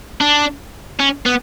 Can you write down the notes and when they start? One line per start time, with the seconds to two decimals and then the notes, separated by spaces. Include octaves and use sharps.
0.21 D4
1.00 C#4
1.26 B3